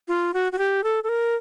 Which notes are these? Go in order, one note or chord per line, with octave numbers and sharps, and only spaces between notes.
F4
F#4
F#4
G4
A4
A4
A#4